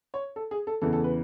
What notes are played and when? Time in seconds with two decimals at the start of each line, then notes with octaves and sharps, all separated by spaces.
0.14 C#5
0.36 A4
0.51 G#4
0.67 A4
0.82 E2 C#3 E3 A4
0.93 A4
1.04 B4